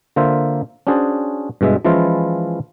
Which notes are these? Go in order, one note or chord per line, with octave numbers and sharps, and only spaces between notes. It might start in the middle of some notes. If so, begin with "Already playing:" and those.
D3 A#3 F4 C5 E5
C#4 D4 F#4 G#4 C5 D5
G2 B2 G#3 E5
E3 F3 G#3 C#4 E4 F4